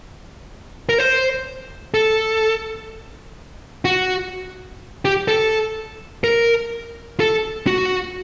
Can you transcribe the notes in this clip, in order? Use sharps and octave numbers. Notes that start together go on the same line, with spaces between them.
A#4
C5
A4
F#4
G4
A4
A#4
A4
F#4